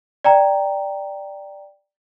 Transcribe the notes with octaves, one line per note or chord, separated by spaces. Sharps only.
D5 G5 A#5